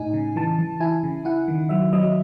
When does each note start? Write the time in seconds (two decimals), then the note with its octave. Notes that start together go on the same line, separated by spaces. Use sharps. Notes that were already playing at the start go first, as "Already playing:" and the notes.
Already playing: A2 D#4 G#5
0.14 C#3
0.36 E3 A5
0.59 E3
0.80 E4 G#5
1.03 C#3
1.25 E4 F#5
1.48 D#3
1.69 F#3 E5
1.93 F#3 D#5